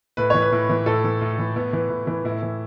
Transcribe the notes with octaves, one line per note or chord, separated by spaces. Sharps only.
A2 B4
E3 C#5
B4
A2
E3
A2 A4
E3
A2
E3
A2 B3
E3
A2
E3
A2 E4
E3